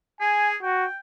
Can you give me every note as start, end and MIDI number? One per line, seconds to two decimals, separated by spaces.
0.21 0.56 68
0.21 0.49 80
0.63 0.85 66
0.63 0.97 79